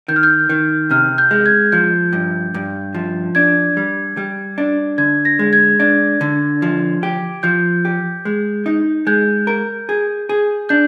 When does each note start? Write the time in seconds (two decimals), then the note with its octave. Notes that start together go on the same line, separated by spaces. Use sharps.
0.08 D#3 G6
0.16 F6
0.23 G6
0.49 D#3
0.91 C3 F6
1.18 G6
1.31 G#3
1.46 G#6
1.72 F3 G6
2.13 G2
2.54 G2
2.94 F3
3.35 D4 G#6
3.77 G3
4.17 G3
4.58 D4
4.98 D3 G#6
5.25 A#6
5.39 G#3
5.53 G#6
5.80 D4 G#6
6.21 D3
6.62 F3
7.03 G4
7.43 F3 G6
7.85 G4
8.25 G#3
8.66 D#4
9.07 G#3 G6
9.47 A#4
9.89 G#4
10.29 G#4
10.69 D4 G6